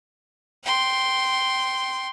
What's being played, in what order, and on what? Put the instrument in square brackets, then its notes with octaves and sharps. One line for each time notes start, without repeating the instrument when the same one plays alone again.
[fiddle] G5 C6